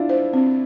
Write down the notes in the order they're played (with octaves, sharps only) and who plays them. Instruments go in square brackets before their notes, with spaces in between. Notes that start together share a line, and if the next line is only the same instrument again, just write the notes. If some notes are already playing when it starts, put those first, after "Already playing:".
Already playing: [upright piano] D4 E4 F4
[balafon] C5
C4